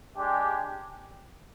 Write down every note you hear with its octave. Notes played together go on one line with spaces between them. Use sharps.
G#3 D4 G4